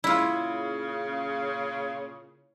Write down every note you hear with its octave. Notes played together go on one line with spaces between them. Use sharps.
A#2 C#3 E4 F4